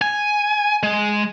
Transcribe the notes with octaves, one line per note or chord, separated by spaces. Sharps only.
G#5
G#3